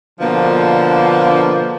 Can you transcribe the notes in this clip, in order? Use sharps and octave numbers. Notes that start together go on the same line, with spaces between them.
B2 D3 F3 A#3 D4